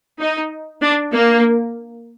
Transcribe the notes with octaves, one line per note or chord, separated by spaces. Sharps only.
D#4
D4
A#3